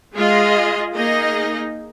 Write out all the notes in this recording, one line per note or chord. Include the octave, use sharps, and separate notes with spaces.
G#3 F4 G#4 D#5
A#3 D#4 G#4 D#5